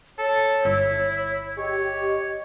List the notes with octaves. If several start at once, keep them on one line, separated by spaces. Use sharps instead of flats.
A4 C#5
G1 E4
G4 C#5 D#5